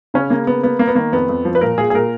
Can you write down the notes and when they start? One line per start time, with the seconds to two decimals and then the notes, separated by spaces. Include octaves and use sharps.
0.14 C#3 C#4
0.30 C#3 A#3
0.47 A#3 B3
0.63 A#3 B3
0.79 A#3
0.88 B3
0.95 D#3 A#3
1.13 F2 B3
1.29 F2
1.45 F3
1.55 B4
1.61 A#2 A#4
1.78 A#2 G#4
1.90 G#4
1.94 A#2 A#4